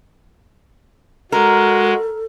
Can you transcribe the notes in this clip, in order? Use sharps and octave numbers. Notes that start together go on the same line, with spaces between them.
G#3 F#4 A4 A#4